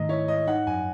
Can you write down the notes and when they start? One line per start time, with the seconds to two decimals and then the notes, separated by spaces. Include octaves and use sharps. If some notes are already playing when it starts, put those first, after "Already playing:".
Already playing: G#2 D#3 A3 D#5
0.09 E4 C#5
0.28 G#2 D#5
0.47 D#4 F#5
0.67 F#2 G#5